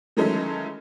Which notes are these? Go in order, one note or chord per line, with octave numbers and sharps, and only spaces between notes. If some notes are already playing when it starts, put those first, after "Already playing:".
D#3 E3 F#3 G#3 A3 C#4